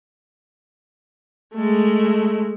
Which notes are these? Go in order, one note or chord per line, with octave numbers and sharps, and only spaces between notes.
G#3 A3